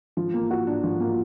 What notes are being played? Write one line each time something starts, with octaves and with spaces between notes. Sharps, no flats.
F3
A#3
F#4
D4
F3
A#3